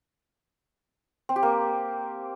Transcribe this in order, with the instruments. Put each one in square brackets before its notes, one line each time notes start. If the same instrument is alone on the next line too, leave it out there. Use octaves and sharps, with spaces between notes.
[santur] C4
G4
A#3